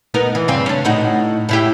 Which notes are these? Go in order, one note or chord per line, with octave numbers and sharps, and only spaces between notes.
B3 D#4 A#4
E3
G2 C#3 C4
C#4 D4
A2 D#4 F#4
A2 E4 G4